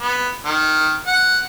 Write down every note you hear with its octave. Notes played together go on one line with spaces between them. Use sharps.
B3
D#3
F#5